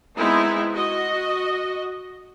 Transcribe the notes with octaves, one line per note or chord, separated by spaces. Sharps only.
G#3 B3 C4 D#4 E4
F#4 D#5